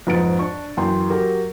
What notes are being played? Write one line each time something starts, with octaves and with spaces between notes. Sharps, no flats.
F2 G#2 B4 A6 D7
D4 C#6
F#2 E3 G5 C6
F#3 G4 A#4